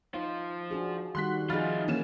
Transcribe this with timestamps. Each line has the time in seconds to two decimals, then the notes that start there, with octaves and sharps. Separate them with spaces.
0.14 F3 D#4 F4
0.71 D4 F#4 G#4
1.15 D#3 G3 F#4 C6 F#6 B6
1.50 F3 D#4 F4 G#4 B5 F6 A6
1.88 E3 A#3 C#4 E7